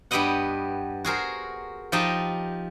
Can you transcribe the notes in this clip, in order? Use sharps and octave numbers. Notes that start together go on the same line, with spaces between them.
G2 B3 G4 B4 D#5 F#5
F#4 G#4 A#4 C5
F3 D#4 G4 D#5 A5